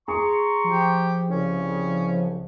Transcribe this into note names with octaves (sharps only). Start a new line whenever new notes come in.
G#4 A#5 C6 C#6
F3 G4
C2 C#3 C#4